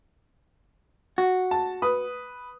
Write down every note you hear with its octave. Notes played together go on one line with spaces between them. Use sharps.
F#4
A5
B4 D#6